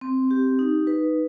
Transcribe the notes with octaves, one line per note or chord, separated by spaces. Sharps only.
C4
G4
D#4
B4